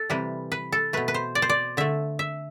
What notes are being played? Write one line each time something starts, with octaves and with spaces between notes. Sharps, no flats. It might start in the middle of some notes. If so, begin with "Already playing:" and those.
Already playing: A4
C3 E3 G3 B4
B4
A4
B2 A3 B4
B4
C5
D5
C5
D5
D3 A3 E5
E5